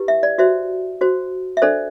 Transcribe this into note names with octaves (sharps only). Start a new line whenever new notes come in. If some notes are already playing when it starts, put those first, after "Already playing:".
Already playing: E4 G4 B4
E5
D5
F#4 C5 E5
F#4 C5
E5
D4 A4 C5 D5